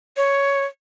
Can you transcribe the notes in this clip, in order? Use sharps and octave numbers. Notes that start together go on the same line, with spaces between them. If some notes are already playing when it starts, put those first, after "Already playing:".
C#5